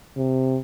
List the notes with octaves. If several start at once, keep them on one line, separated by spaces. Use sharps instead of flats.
C3